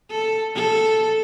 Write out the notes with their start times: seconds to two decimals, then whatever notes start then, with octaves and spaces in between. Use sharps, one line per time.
0.11 A4
0.55 A4